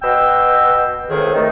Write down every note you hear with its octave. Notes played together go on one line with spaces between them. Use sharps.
B2 G5 E6
C#2 A2 C3 D#3 G#4 C5
D#3 A3